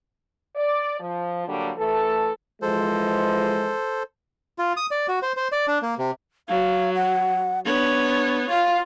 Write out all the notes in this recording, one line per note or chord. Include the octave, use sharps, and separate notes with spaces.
D5
F3
D3 F#3 G3 A#3
E3 A3 A4
E3 F3 G#3 A4 C5
F4
D#6
D5
F#4
C5
C5
D5
D4
A#3
C3
F#3 F5
F#5
B3 D4 C#5
F4 F5